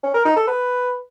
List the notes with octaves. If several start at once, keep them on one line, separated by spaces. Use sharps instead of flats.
C#4
A#4
D#4
A4
B4